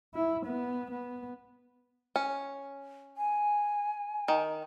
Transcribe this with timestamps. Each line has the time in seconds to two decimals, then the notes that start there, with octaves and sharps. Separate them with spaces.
0.14 E4
0.46 B3
0.91 B3
2.16 C#4
3.17 G#5
4.28 D#3